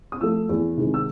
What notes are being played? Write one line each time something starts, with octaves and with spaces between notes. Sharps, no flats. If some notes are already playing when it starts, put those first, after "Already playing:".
D#6
F3 A3 E6
E2
C3 D#3 G#3
E6